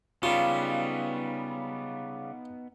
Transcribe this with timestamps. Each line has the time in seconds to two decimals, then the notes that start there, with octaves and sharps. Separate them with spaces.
0.23 C#3 G3 B3 D#4 F4